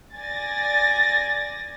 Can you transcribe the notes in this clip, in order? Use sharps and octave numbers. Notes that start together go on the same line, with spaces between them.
D5 G#5 A6 A#6